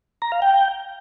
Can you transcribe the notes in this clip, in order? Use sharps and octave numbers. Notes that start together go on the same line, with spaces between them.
A#5
F5
G5